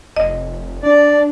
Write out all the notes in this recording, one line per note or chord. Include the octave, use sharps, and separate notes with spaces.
F1 D#5
D4 D5